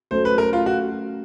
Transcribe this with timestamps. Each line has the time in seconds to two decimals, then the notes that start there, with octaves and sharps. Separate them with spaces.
0.11 F#3 A3 C#4 F#4 A4 C5
0.25 B4
0.38 A#4
0.53 F4
0.66 F#4